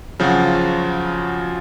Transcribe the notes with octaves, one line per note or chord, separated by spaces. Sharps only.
C#3 F3 F#3 C4 F4 F#4